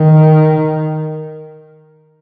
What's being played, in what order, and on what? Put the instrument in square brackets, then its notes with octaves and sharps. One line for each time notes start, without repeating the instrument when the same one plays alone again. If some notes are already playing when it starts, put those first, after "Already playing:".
Already playing: [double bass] D#3